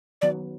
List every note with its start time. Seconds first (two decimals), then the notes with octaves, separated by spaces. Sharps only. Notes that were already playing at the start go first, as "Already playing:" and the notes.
0.22 D#3 F#3 B3 D5